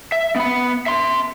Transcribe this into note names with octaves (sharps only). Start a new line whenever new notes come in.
E5
B3 B5
E5 C6